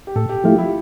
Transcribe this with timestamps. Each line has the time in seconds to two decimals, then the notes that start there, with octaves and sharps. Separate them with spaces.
0.07 G4
0.16 A2 A4
0.29 G4
0.44 F3 A3 E4 F4 G4
0.58 E4